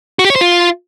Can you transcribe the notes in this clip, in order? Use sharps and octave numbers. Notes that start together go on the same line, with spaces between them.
F#4
G4
C#5
C5
F4